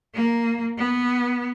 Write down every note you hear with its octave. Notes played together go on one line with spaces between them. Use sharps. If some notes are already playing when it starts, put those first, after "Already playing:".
A#3
B3